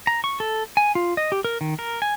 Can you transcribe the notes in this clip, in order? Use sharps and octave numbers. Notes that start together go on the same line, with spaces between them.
A#5
C#6
A4
G#5
F4
D#5
G4
A#4
D#3
A#4
G#5